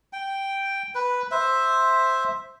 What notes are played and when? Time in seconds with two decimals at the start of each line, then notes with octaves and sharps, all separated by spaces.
0.13 G5
0.95 B4
1.31 C5 E5